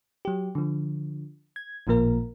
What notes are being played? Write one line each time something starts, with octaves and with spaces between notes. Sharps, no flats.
F#3 G4
D3 F3
G#6
A1 A#2 F3 A#3 A#4